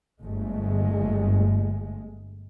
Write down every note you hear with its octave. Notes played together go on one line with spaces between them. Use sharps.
G1 G#3 A3